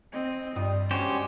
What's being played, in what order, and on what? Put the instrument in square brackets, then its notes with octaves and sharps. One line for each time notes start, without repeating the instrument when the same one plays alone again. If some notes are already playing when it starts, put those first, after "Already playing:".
[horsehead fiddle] C4 D#5
[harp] G2 F4 D#6 [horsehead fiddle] G3
[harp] G#3 D4 F#4 [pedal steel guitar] C#4 G4 C5